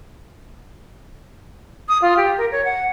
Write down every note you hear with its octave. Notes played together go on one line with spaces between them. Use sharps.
D#6
F4
G4
A#4
C#5
F#5